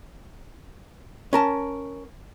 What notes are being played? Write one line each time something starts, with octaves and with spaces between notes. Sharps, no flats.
C#4 A#4 A5